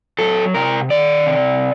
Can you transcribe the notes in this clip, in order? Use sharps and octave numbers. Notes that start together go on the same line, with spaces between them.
F#3 A4
C3 A#4
D#3 D5
C3